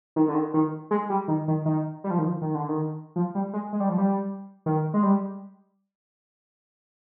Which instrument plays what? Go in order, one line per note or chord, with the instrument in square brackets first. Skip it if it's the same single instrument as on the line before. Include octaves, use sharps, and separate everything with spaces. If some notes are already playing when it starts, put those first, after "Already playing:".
[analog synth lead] D#3
D3
D#3
D#3
G#3
G3
D#3
D#3
D#3
G3
F3
D#3
F3
D#3
D3
D#3
F3
G3
G#3
G#3
G3
F3
G3
D#3
G#3
G3